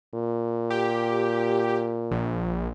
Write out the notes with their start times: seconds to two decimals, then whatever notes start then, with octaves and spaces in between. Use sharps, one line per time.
0.14 A#2
0.70 G4
2.11 A#1